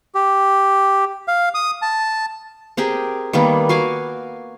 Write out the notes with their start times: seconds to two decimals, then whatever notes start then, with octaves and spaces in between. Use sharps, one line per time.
0.15 G4
1.28 F5
1.55 D#6
1.82 A5
2.77 C4 G4 G#4 A#4
3.33 D#3 G3 A#3 B3
3.69 F#4 F5 G#5 D6